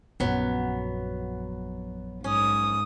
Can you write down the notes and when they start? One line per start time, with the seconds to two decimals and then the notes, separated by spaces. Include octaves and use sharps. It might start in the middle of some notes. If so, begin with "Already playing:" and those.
0.20 A#1 F#2 F#3 B3
2.24 G#2 C#4 D#6